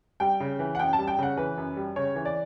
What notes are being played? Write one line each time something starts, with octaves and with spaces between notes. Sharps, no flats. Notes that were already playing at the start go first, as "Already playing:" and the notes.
G3 G5
C#3
E3
F#5
F#2 G5
A5
G3
G5
C#3 F#5
E3 B4
F#2
G3
C#3 C#5
E3
D5